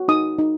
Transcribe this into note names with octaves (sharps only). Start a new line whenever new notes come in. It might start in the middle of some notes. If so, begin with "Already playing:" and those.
Already playing: F#4
D#4 D#6
D#4